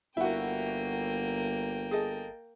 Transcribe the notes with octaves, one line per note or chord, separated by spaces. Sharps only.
G1 A#3 E4 F#4 G5
G#4 A4 D#5